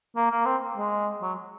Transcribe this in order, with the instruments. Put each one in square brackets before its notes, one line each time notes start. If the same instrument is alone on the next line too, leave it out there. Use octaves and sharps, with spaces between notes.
[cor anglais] A#3
A#3
C4
G#3
F#3